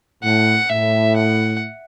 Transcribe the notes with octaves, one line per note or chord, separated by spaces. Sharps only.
A2 F#5
A2 E5
F#5